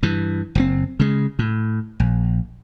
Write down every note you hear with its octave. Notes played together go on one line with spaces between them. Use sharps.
G2 E3
F#1 B2 C4
C#3 G#3
A2
A#1